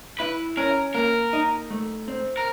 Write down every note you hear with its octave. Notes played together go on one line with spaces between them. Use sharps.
E4 B4
C#4 A#4
A#3 A#4
D#4
A3
C4
A#4